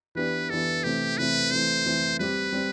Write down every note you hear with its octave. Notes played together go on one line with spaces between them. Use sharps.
E3 B3 D4 G4 B4
E3 B3 D4 G4 A4
C3 E3 A3 C4 G4
C3 E3 A3 C4 B4
E3 A3 C4 C5
E3 A3 C4
G3 C4 G4 B4
G3 C4 G4